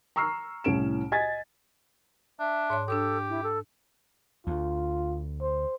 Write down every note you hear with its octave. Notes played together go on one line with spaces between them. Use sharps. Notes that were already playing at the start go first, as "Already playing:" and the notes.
A#5 C#6 E6 F6 C7
C2 A2 C#4 D7 E7
D#5 G#5 G#6 A6 B6
D4 E5
G#2 C#5 C6
D4 G4 A4 D6 D#6
E4
A4
D2 F4
C5